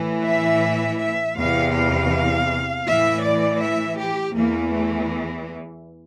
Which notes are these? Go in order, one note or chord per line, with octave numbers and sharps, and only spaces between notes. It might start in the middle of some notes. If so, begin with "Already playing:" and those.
Already playing: A2 E3
E5
E5
E2 C3 E3 F5
F5
A2 E3 E5
D5
E5
G4
E2 E3 A#3
A3